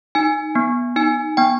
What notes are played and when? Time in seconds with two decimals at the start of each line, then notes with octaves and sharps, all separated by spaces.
0.15 D#4 G#5
0.55 B3
0.96 D#4 G#5
1.37 B3 G5